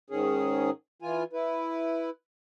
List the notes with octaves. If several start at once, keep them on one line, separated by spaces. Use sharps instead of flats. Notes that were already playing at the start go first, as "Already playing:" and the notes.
G#2 D#3 C#4 G#4
E3 F4 G#5
E4 B4